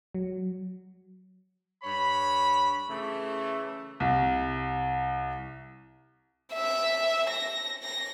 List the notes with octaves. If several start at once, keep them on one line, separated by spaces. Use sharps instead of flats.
F#3
G2 C#5 B5
C#3 E3 A3
C2
E5
A#6
A#6